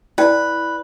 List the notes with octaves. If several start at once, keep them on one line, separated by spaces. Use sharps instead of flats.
E4 B4 D5 G5